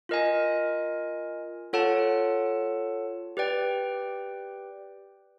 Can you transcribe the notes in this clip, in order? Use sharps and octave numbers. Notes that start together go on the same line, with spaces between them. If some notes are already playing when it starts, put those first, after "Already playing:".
F4 A#4 D#5 G#5
F4 A4 C#5 F#5 A5
G4 B4 D5 G5